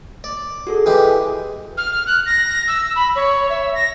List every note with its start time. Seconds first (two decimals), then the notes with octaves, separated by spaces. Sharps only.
0.24 D5
0.67 F#4 G#4 A4
0.86 E3 G#3 G4
1.77 F6
2.07 F#6
2.26 A#6
2.68 E6
2.96 B5
3.16 C#5
3.50 E5
3.75 A#6